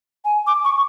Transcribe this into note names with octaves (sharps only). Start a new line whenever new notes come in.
G#5
D6
C#6